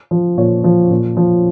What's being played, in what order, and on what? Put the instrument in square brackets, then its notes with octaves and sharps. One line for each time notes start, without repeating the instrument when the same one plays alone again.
[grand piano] F3
A#2 C#5
F3
A#2
F3